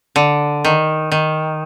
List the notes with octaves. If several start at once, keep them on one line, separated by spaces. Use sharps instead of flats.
D3
D#3
D#3